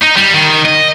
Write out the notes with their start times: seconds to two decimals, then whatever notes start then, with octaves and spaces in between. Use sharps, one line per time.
0.02 D#4
0.16 G3
0.34 D#3
0.65 D#5